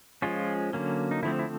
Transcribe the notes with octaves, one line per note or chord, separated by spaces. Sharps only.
F3 G#3 C#4 F4
D3 F#3 A#3 C#4
D#4
D3 F3 A3 C4 E4
E4